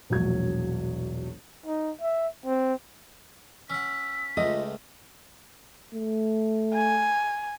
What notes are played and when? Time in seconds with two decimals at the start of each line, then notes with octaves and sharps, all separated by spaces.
0.10 E1 A#1 F#3 G#6
1.66 D#4
2.01 E5
2.45 C4
3.70 C#4 F#5 E6 B6
4.37 C#2 A3 F4 D#5 D#6
5.95 A3
6.74 G#5